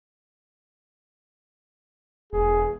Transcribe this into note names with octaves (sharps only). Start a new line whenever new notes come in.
E1 G#4